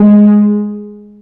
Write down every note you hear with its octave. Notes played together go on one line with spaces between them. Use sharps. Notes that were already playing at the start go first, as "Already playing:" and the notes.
Already playing: G#3